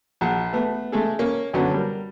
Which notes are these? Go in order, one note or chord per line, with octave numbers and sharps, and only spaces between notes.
A#1 F#5 A5
A3 B3
G#3 A3 G#4 A4
A#3 C#4
F#2 D3 F#3 B3 C#4
G3 A#4